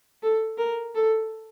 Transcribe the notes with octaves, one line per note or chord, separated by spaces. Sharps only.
A4
A#4
A4